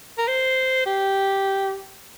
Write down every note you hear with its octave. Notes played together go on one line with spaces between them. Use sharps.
A#4
C5
G4